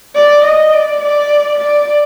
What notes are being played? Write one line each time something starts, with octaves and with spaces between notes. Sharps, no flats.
D5
D#5
D5
D5
D5